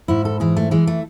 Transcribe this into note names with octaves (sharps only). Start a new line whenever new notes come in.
G#2 E4
A4
E3 G#4
A3
E3 G#3
A3